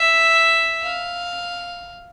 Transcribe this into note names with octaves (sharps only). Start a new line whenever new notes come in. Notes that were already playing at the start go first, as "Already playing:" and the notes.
Already playing: E5
F5